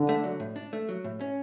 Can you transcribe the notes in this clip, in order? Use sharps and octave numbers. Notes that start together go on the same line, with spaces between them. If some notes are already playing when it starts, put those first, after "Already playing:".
Already playing: D3
A3
F#3
A2
D4
A3
F#3
A2
C#4